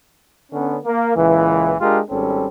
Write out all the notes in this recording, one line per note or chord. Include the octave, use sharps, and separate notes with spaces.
D3 B3 C#4
A#3
C#2 A#2 E3
G#3 D4 F4 G4 A#4
G#1 G3 C4 C#4 A4